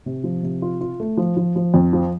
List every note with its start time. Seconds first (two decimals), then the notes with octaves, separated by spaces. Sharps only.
0.06 C3
0.24 F3
0.43 C3
0.62 F4
0.81 F4
1.00 A3
1.17 F3
1.37 F3
1.56 F3
1.74 F2
1.93 F3